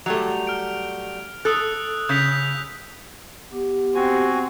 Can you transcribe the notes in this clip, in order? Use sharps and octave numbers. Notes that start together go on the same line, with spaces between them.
F#3 G3 A3 F7
F6 D7
A4 D#6 E6 F#6
C#3 G6 B6 F7
B3 G4
C4 F#4 G#5